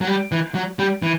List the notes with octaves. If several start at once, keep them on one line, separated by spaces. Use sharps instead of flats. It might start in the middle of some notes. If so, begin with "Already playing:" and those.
F#3
G3
E3
F#3
G3
E3